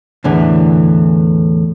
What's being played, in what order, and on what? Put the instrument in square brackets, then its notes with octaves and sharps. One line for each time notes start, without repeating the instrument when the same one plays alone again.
[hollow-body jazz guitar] E2 A2 D3 E3